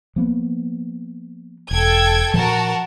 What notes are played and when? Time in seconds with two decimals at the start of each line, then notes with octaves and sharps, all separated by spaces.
0.16 F3 A#3 B3
1.71 E1 A4 G5 G#6
2.34 A#2 F3 F#4 A#4 A5